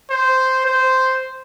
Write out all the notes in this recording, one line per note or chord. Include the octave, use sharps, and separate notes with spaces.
C5
C5